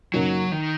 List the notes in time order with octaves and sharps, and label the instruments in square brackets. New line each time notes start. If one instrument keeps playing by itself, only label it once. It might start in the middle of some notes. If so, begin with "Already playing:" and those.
[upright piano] F#2 C#3 A#3 D#4 F#4 [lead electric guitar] F#3
[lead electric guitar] D#3